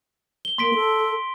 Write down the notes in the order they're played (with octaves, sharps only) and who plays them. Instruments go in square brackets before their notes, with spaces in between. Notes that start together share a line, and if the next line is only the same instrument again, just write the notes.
[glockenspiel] G7
[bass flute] A#3 [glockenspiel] C6 B6 D7
[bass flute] A4